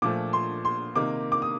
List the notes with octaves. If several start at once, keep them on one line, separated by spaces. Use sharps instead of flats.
A#2 F3 A3 D6
C6
C6
C3 D#3 A#3 D#4 D6
D6
D#6